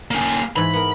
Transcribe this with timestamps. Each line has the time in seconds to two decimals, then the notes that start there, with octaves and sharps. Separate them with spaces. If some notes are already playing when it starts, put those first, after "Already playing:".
0.11 A#3 C#4
0.56 G#2 E3 B5
0.73 B3 A#4